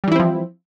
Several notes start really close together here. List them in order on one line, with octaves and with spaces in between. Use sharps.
G3 E3 E4 C4 F3